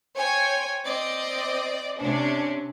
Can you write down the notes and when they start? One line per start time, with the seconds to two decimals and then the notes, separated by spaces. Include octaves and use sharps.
0.17 C5 C#5 G5 G#5
0.86 C4 D5 D#5
2.01 C3 C#4 D4